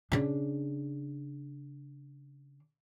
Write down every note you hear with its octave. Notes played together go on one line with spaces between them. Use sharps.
C#3 D4